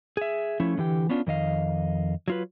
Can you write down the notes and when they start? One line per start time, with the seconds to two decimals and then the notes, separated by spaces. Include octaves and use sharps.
0.17 G#4 E5
0.60 F3 A3 C#4 E4
0.77 D3 E3 G4 G5
1.09 B3 C#4 D4 F4
1.27 F2 D#3 D#5 F5
2.28 F#3 F4 B4